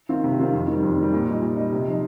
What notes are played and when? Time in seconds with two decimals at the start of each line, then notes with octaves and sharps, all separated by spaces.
0.09 D#3 C4 F4
0.24 C3
0.39 D#3 C4 F4
0.53 F2
0.68 D#3 G3
0.83 F2
0.98 D#3 G3
1.13 A#2
1.27 G3 D#4
1.42 A#2
1.57 G3 D#4
1.72 C3
1.87 F3 D#4